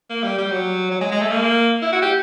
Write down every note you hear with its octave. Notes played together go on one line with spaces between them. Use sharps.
A#3
G3
G3
F#3
F#3
G#3
G#3
A3
A#3
E4
F#4
G4